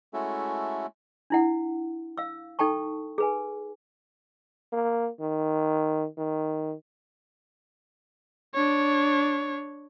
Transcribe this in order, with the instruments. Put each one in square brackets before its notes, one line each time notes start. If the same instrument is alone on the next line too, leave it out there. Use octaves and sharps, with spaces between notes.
[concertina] G#3 A3 C#4 E4 F#4 A4
[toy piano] D4 E4 F#5
F5 E6
D#4 A4 G5 A5 C#6
G#4 B4 G#5
[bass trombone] A#3
D#3
D#3
[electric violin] D4 C#5